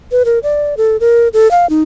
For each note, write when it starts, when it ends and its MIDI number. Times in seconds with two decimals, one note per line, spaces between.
0.11 0.23 71
0.25 0.39 70
0.43 0.74 74
0.77 0.97 69
1.00 1.28 70
1.33 1.50 69
1.51 1.69 77
1.70 1.83 63